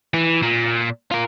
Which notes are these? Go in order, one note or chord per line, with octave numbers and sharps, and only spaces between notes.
E3
A#2
F4 A#4